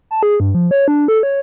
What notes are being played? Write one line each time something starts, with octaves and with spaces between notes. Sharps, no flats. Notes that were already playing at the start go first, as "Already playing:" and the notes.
A5
G#4
G2
F3
C#5
D4
A4
C#5